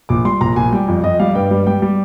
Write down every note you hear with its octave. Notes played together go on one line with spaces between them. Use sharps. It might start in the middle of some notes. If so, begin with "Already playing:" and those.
A#1 D6
G3 C6
A#1 A#5
A#1 G#5
G3 G5
F2
F2 D#5
G3 F5
G2 G5
G3
G3 G5
G3